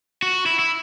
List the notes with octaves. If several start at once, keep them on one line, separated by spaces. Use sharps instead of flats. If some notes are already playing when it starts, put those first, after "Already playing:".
F#4
E4
E4